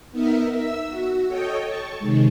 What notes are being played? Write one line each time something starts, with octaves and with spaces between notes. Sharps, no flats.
B3 D#4 A#4 E5
E5 E6
F#4
A4 C#5 D#5 G5
A5 C#6
C3 D#3 G#3